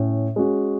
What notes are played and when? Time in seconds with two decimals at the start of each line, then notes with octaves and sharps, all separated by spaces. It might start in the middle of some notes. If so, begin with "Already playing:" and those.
Already playing: A2 C#4
0.36 G#3 C#4 F#4